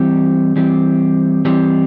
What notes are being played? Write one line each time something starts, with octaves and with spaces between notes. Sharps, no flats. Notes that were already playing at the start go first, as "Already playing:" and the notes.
Already playing: E3 G3 C4 G4
E3 G3 C4 G4
E3 G3 C4 G4